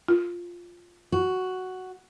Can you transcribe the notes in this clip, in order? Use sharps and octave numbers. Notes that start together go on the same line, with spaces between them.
F4
F#4